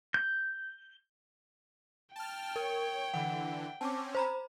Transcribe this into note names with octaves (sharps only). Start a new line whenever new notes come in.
G6
G5 A5 F6
A#4 C#5
D3 E3 F#5
C4 C#4 A5 D6
C5 A#5 B5